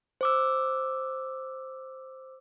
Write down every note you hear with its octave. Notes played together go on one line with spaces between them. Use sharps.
C5 D6 E6